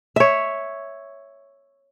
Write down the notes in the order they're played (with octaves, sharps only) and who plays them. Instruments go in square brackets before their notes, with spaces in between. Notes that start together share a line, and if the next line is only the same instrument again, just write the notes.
[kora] C#5 E5